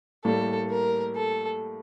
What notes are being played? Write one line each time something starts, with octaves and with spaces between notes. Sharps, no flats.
A2 G3 A#3 A4
A#4
A4